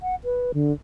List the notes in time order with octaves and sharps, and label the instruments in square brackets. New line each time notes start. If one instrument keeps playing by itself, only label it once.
[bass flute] F#5
B4
D3